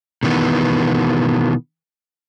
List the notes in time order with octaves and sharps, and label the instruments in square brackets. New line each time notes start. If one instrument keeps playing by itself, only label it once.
[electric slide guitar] B2 D#3 E3 B3